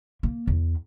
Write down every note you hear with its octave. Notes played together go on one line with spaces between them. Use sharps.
A#3
E2